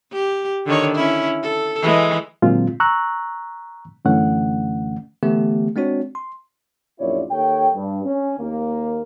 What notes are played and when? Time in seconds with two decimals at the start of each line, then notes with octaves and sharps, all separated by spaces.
0.12 G4
0.66 D3 D#3 C#5
0.95 C#4 E4
1.43 A4
1.82 E3 G#3
2.42 A#2 D3 F#3 G#3 C4 F4
2.80 A#5 C#6 E6 F#6
4.05 F#2 D3 E3 A3 C#4 F#5
5.23 D3 E3 A3 B3 G4
5.76 G#3 C4 D4 F#4 C#5
6.15 C6
7.00 A#1 F#2 E4 F4 C#5 D5
7.31 D#2 A4 C#5 G5
7.74 G2
8.05 C#4
8.40 D#2 A#3